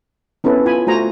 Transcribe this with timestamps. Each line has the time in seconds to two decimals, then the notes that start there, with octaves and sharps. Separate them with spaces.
0.44 B3 C#4 E4 A4 B4
0.66 F4 G#5 B5
0.87 A3 F4 F#4 C5 G#5 A#5